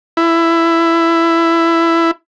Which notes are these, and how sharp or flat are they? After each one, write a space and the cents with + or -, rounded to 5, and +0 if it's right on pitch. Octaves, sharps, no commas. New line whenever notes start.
E4 +15